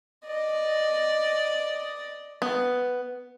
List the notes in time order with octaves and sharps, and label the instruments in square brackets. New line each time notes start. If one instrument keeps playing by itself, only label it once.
[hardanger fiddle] D5 D#5
[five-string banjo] B3